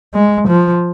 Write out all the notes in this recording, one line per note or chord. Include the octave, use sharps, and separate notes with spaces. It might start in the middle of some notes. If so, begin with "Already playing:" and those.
G#3
F3